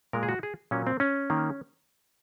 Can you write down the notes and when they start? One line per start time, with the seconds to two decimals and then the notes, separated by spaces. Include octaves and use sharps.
0.13 A#2 G#3 A#4
0.23 G#4
0.29 F#4
0.43 G#4
0.71 A#2 F#3 A#3 C#4
0.87 C4
1.00 C#4
1.30 D#3 A#3